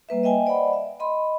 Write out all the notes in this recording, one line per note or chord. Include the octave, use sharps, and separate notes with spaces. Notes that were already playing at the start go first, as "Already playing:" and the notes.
G3 A#3 B4 E5
D#5 E5 G5 G#5
C5 D5 D#5 F#5 B5
E5
D#5 B5 C6